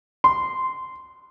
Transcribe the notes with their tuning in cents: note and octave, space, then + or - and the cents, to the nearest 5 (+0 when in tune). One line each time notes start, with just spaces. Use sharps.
C6 -15